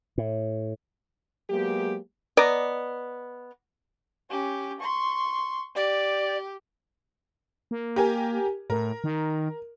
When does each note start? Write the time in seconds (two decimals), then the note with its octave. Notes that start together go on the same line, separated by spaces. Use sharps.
0.18 A2
1.49 F#3 G#3 A#3 B3 G4
2.37 B3 D5 D#5 A#5
4.31 C#4 G4
4.80 C6 C#6
5.76 G4 D5
7.71 A#3
7.96 G4 A#4 G#5
8.70 A2 A#4
9.04 D#3